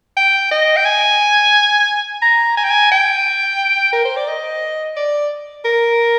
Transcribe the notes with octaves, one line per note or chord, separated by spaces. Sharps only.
G5
D#5
G5
G#5
A#5
G#5
G5
G#5
G5
A#4
C5
D5
D#5
D5
A#4